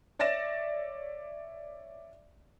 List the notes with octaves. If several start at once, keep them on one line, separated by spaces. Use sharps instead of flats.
C#5 D5 E5 A6 A#6 E7